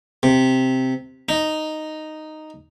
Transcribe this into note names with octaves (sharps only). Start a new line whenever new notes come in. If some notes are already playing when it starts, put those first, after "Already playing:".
C3
D#4